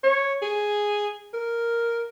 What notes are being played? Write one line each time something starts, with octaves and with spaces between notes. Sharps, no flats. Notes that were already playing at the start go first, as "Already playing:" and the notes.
C#5
G#4
A#4